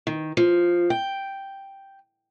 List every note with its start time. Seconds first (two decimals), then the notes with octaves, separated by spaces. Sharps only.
0.07 D#3
0.37 F3
0.90 G5